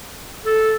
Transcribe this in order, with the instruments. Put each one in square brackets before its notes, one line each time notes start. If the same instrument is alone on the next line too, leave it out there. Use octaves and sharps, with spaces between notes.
[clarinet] A4